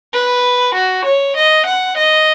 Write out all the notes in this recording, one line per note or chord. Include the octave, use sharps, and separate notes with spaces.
B4
F#4
C#5
D#5
F#5
D#5